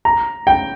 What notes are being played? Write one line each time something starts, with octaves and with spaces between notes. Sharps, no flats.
A#5
G5